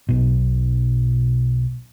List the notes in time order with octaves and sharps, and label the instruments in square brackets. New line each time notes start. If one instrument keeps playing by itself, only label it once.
[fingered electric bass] B1 B2